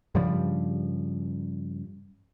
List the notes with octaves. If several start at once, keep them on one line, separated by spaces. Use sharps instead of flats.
G2 C#3 F3 G3